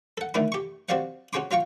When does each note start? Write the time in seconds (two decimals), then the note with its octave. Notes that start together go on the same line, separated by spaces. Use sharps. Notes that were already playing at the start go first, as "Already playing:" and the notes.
0.18 A4 F#5
0.34 D3 D#3 A3 D4 E4
0.52 G4 C#6
0.89 C4 F#4 G4 D5 F5 F#5
1.33 C#4 F#4 G#4 G5 C6 D6
1.51 F#3 F4 F5 G5 C#6